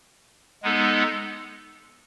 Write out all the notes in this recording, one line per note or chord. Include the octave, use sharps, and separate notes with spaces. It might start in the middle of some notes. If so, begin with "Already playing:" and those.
G#3 B3 D#4 A4